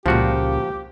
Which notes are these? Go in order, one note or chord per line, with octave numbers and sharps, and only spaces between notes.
C#2 A#2 C#3 F3 F#4 G4